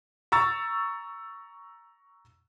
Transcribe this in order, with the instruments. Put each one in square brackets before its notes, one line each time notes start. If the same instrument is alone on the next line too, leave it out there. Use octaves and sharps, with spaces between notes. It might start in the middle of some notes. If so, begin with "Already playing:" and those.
[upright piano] A#5 C#6 E6 A6